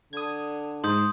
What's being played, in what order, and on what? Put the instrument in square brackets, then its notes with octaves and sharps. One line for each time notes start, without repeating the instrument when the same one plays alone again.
[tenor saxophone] D3 [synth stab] D#6 G#6
[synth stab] G#2 [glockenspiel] C6 D#6 G6